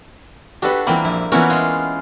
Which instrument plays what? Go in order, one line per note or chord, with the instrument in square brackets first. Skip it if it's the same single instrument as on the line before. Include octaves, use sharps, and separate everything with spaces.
[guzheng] D4 F#4 A4 [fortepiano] G4 B4
[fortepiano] E3 G5 B5 [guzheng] G3 A#3 C4
[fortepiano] A#1 [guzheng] E4
[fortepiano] E3 B3 A#4 [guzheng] C#4 E4 F#4
[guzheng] G#3 F4